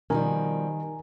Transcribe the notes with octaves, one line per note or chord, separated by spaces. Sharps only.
B2 D#3 F3 G3 A#4 G#5 A#5